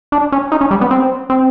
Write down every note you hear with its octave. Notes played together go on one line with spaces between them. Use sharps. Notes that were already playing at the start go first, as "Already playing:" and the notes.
D4
C#4
D#4
C#4
G3
B3
C4
C4